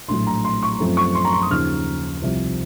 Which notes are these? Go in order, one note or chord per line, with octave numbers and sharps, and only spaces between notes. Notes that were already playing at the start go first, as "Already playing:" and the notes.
A#1 A2 F#3 C6
A#5
C6
C#6
F#2 F3 A3 C4
C#6
C6
A#5
C6
D#6
D#2 C#3 F3 F6
C2 C3 F3